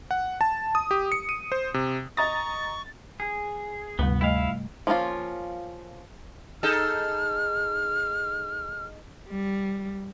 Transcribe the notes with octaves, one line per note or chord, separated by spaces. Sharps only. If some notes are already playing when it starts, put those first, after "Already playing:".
F#5
A5
D#6
G4
C#7
D#7
C5
C3
D#5 A#5 C#6 D#6 A6
G#4
D2 G2 C3 G3 B3
G3 A3 E4 D#5 F5
F3 A#3 C#4 D#4 F4
D#4 G#4 A4 F6
G3